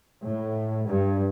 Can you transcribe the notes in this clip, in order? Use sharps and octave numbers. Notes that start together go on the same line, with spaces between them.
A2
G2